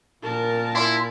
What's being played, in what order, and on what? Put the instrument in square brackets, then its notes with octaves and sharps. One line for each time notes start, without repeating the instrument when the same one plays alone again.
[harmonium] A#2 [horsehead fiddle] A#4 A5
[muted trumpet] E4 [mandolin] C6